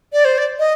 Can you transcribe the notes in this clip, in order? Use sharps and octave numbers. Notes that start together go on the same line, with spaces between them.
D5
C5
D5
D#5